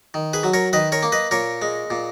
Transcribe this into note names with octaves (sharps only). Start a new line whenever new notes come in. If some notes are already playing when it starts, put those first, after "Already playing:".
D#3
G#4 B4
F#3
A#4 C#5
D#3 B4 D#5
A#4 C#5
A#3
B4 D#5
A#2 A#4 C#5
G#3
A#2